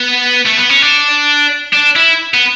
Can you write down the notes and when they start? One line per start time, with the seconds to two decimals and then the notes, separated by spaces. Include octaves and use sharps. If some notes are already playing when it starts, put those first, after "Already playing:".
Already playing: B3
0.46 A3
0.58 B3
0.70 C#4
0.82 D4
1.73 D4
1.96 E4
2.34 B3